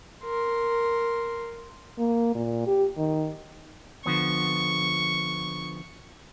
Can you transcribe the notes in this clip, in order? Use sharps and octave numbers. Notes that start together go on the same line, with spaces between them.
A#4 C6
A#3
A#2
G4
D#3
D3 F3 B3 C#6